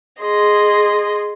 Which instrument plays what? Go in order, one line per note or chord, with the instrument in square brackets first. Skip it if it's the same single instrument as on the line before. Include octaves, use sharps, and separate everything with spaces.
[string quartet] G#4 D#5 C6